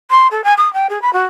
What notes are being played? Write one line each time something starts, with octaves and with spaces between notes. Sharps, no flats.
C6
A4
G#5
D#6
G5
G#4
B5
F#4